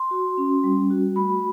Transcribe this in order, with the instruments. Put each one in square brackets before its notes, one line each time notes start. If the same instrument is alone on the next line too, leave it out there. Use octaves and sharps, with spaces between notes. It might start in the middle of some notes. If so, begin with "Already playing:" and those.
Already playing: [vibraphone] C6
F#4
C#4
G3
F#4
A3 B5